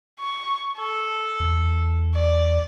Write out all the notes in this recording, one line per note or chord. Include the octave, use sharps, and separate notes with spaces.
C#6
A4
E2
D5